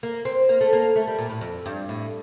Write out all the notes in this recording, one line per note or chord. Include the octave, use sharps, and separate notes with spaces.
A#3
C4
A#3
A3
A#3
A3
G3
A#2
A2
F2
G2
A2